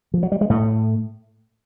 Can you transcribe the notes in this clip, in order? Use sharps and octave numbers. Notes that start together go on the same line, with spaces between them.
F3
F#3
G3
G#3
A2 A3